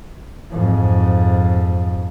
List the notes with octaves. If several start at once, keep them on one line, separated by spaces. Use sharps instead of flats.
F2 G#2